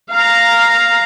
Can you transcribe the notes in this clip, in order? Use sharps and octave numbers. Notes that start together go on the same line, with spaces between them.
F5 A#5